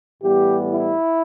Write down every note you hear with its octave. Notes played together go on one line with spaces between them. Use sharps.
A2 E3 G3 B3 G4
E4